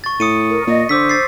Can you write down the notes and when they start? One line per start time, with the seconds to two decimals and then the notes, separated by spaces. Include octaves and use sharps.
0.04 C#6 A6
0.20 A2 D#6 C#7 D#7
0.50 A#4
0.67 A#2 D#5
0.89 D3 C5 D6 E6 B6
1.09 A6 C7